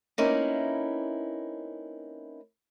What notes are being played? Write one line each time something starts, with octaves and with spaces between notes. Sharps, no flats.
A#3 C4 C#4 D#4 E4 B4